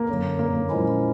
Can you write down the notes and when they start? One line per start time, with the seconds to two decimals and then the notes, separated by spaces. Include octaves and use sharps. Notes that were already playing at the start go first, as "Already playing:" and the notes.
Already playing: A#3
0.09 F#2 D3 F#3
0.39 A#3
0.70 A#2 F3 G#3 C#4 E4